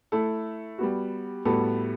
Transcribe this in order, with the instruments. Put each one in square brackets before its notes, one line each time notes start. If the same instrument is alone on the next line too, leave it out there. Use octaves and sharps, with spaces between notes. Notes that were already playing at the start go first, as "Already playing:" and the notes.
[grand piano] A3 E4 A4
G3 B3 F#4
A2 G3 B3 F#4 A4